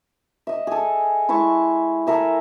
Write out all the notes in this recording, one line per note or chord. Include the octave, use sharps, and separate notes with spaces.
D#5 E5
G#4 A4
G#3 E4 A5 C#6
A4 A#4 E5 G#5